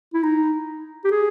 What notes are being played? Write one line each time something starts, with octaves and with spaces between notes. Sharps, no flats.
E4
D#4
G4
G#4